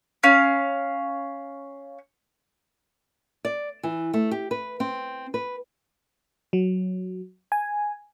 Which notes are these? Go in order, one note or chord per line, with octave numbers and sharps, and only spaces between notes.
C#4 F5
D5
E3
A3
G4
B4
C4
B4
F#3
G#5